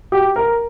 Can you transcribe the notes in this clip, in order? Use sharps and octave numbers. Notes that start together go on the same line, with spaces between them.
G4
A#4